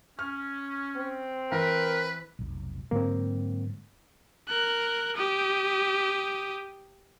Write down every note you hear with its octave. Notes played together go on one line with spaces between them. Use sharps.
C#4 F6
C4
E3 A#4 B4
F1 B1
G#2 D3 F#3 A#3 C4
A#4 F#6
G4 D#6